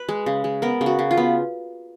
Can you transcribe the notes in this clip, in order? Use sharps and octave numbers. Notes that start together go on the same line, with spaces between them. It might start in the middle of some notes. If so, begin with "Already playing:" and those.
Already playing: B4
G#3
C#3
G#3
B3 A#4
C#3
F#4
C#3
F4
B3